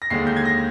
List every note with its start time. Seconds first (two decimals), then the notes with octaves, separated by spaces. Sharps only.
0.02 A#6
0.10 D#2 D3 G#3 C7
0.27 G6
0.37 G#6
0.45 A#6